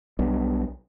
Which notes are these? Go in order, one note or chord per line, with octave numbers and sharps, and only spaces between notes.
B1 G3 B3 D4